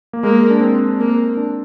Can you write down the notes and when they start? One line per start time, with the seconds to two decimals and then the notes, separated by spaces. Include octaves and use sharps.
0.13 A#3
0.23 G#3 A#3
0.50 D4
0.61 C4
0.99 A#3
1.37 D4